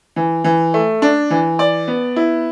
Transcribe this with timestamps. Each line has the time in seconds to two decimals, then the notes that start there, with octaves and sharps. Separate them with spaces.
0.16 E3
0.44 E3
0.74 A3
1.02 D4
1.30 E3
1.59 D5
1.88 B3
2.16 E4